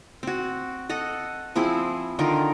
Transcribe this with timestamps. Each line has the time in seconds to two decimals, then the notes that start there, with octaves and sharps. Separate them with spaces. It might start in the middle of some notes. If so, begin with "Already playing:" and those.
0.23 C4 F#4
0.89 A4 D#5 F#5
1.56 F3 C4 E4 G#4
2.19 D3 D#3 F4 A#4